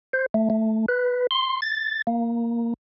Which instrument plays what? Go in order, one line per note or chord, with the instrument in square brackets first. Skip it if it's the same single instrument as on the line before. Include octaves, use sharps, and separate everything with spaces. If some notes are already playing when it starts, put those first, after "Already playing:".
[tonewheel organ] C5
A3
A3
B4
C6
A6
A#3